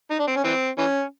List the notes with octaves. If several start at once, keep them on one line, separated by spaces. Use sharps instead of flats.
D#4
D4
C4
C#4
E3 C4
E3 C#4